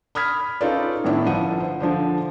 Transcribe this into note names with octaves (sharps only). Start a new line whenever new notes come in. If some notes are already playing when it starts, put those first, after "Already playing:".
B5 D#6 F6 G#6 B6
C#4 D#4 F4 A4 B4 D5
A2 D#3 B3 C#4 D4 E4
G1 F3 F#5 D#7
C5
D3 F3 D4 C5